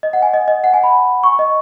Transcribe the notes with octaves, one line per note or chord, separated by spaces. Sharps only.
D#5
F#5
G#5
D#5
D#5
F#5
G#5
B5
C#6
D#5